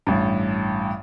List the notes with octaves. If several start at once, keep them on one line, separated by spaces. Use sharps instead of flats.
A1 G2